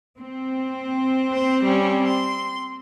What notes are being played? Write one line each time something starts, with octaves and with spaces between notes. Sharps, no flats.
C4
C5
G3 C#4
C6